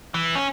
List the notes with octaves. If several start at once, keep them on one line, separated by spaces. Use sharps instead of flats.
E3
C#4